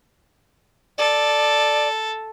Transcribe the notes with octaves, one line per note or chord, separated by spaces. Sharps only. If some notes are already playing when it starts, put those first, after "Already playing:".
A4 D5